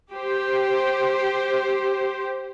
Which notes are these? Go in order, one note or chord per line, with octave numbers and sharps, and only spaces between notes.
G4 C5